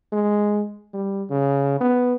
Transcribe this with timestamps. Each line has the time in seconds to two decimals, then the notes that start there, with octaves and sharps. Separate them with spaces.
0.12 G#3
0.94 G3
1.30 C#3
1.80 B3